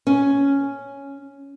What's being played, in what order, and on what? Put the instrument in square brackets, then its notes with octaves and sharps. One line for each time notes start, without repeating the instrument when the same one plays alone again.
[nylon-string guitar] C#4